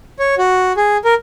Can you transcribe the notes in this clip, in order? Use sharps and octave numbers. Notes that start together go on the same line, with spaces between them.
C#5
F#4
G#4
A#4